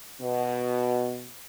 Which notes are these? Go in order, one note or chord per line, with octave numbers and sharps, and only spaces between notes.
B2